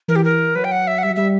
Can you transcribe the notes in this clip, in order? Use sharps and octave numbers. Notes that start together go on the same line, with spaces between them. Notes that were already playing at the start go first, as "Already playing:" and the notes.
E3 A#4
G4
A#4
F#3 B4
G5
F#5
E5
F#5
G3 E5
F#3
G3 E5